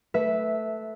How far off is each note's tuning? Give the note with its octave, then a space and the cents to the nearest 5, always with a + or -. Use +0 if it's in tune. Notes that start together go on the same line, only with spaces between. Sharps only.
A3 +0 B4 +0 E5 -10